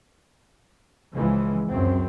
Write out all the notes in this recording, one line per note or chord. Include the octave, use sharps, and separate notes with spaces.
C#2 C#3 E3 F3 G#3
C#2 F#2 C4